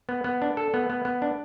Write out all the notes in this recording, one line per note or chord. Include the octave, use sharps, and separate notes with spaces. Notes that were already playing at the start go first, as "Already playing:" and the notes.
B3
B3
D4
A4
B3
B3
B3
D4